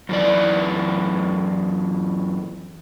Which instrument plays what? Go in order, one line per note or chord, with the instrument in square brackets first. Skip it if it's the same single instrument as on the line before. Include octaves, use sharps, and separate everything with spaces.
[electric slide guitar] F#2 E3 D5